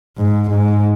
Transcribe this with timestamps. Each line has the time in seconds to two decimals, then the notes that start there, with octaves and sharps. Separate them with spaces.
0.18 G#2
0.50 G#2